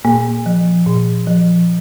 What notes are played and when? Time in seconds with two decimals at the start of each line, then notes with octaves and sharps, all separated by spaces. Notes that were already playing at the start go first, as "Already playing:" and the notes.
0.05 A#2 A#3
0.46 F3
0.86 A#2
1.27 F3